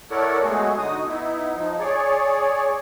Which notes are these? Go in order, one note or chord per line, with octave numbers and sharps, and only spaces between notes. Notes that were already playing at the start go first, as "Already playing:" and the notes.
E4 A4 A#4 C#5 D5 F#5
F#3 G#3 A3 B3 F#4 G#4
D3 D#4 F#4 D#6
B3 D#4 E4
F3 D#4
G#4 C#5 D5